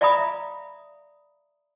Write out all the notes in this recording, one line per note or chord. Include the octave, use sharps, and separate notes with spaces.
D5 E5 F5 A#5 B5 D#6